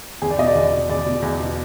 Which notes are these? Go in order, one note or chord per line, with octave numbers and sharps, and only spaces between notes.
E2 G#4
D5
B2 D#5
D5
E2
B2
E2 D5
B2
E2
B2